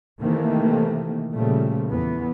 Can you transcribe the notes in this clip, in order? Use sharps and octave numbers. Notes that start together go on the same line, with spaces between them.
C3 D#3 E3 A3 A#3
A#2 C#3 F3 G3 A3
E2 E3 B3